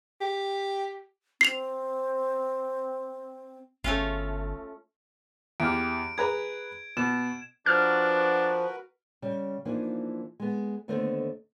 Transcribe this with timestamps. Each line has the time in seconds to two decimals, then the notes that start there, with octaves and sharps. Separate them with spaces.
0.21 G4
1.41 C4 C7 F7
3.84 G1 A3 C#4 F4
5.60 E2 G4 F6 D7
6.18 G#4 B4 A#5 G#6
6.97 B2 E7
7.66 F3 D4 F#4 A#4 B4 F6
9.22 C#3 G3
9.65 E3 F3 A#3 D4 D#4
10.40 G#3 B3
10.88 D#2 D3 A3 B3 C5 D#5